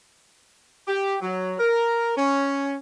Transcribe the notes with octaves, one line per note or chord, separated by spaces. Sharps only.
G4
F#3
A#4
C#4